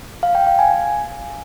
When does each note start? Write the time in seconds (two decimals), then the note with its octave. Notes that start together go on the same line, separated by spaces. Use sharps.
0.23 F5
0.35 G5
0.47 F5
0.59 G#5